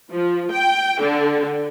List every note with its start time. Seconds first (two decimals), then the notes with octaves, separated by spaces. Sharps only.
0.11 F3
0.52 G5
1.01 D3